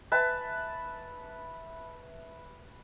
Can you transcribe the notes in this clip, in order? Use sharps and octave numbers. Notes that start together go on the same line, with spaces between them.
B4 E5 A5